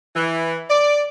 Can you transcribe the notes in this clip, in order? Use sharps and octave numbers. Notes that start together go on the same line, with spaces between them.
E3
D5